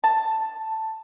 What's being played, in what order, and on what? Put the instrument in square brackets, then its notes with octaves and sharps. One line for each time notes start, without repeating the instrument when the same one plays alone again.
[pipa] A5